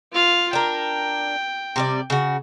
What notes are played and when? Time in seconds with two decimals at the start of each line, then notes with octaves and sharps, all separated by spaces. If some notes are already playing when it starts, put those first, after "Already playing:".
0.12 F4 F5
0.53 D4 A#4 G5
1.76 C3 G3 D5
2.10 C#3 F#4